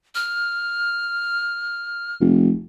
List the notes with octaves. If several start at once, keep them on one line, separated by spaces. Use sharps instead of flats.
F6
F1